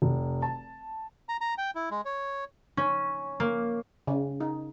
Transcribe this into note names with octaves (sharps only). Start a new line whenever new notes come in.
F1
A5
A#5
A#5
G5
E4
G#3
C#5
C#4
A#3
C#3
D#4